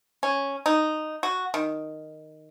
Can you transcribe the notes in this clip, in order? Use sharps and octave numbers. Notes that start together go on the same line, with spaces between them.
C#4
D#4
F#4
D#3